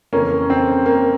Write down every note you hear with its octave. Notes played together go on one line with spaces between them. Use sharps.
F2 C#3 E3 A#3 C#4
C4
A#3